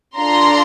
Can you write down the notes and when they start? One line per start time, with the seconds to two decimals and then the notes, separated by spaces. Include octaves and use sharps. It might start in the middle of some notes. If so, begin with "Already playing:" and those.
0.18 D4 F4 A4 A#5 C6